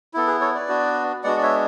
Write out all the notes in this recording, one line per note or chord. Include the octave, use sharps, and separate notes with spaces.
B3 E4 A4
G#4 B4
A4 C#5
B4 D5
B3 D4 F#4
G#3 B3 D4 F#4 D5 F#5
D5
C#5 E5